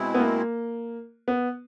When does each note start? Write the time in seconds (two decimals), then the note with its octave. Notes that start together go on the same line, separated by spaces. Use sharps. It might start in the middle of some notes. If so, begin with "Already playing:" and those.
Already playing: B2 G#3 C4 E4
0.14 B3
0.20 A#3
1.28 B3